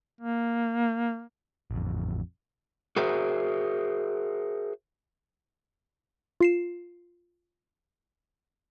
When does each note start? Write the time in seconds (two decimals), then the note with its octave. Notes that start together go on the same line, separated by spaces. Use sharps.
0.21 A#3
1.71 A1 F2
2.96 F#4 G#4 A#4 C5 E5
6.40 F4 C7 E7